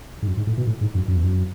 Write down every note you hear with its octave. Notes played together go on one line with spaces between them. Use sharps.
G#2
F#2
G#2
A2
B2
A2
G#2
F#2
F#2
E2
F#2